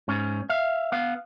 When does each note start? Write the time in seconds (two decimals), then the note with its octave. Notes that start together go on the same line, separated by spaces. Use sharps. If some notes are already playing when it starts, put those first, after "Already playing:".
0.08 G#2 C#4
0.50 E5 F5
0.92 B3 F5